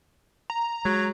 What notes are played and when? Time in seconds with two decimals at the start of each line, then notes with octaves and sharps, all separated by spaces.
0.50 A#5
0.85 F#3 G#3